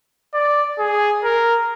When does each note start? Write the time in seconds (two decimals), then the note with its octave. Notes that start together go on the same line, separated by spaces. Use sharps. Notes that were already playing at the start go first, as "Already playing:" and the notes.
0.34 D5
0.79 G#4
1.24 A#4